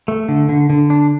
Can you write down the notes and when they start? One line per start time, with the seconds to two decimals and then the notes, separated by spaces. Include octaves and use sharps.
0.08 A3
0.28 D3
0.49 D3
0.70 D3
0.90 D4